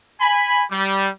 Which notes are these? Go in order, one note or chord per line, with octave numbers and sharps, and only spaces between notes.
G#5 B5
G3